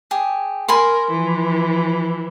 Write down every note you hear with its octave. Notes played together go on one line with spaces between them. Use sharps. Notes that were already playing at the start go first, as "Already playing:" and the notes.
G4 G#4
A#4 G#5 B5 C6
E3 F3